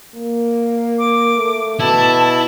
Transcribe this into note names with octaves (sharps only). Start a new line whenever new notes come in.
A#3
D6
A3
B2 E4 A5